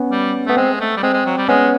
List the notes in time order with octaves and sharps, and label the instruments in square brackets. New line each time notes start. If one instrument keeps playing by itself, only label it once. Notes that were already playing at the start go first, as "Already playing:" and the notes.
Already playing: [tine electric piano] B3 C#4
[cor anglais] G3
[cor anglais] A3 [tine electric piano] B3
[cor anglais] G#3 [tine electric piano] C4
[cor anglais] A3
G3
[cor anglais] G#3 [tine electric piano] C4
[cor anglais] G#3
F#3
G3
[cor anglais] G#3 [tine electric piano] B3 C#4